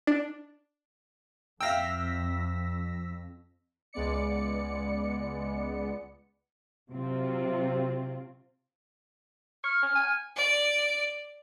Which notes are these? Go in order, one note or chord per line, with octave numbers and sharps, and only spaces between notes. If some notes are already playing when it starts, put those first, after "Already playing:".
D4
F2 E5 F5 G5 E6 A#6 B6
C#2 G#3 B3 D5 C#7
C3 F#3 C4 F4
C#6 F6
C#4
G#5
D5